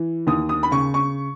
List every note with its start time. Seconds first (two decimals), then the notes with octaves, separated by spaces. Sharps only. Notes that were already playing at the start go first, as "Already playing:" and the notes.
Already playing: E3
0.27 D#2 D#6
0.49 D#6
0.63 B5
0.71 C#3 C#6
0.94 C#6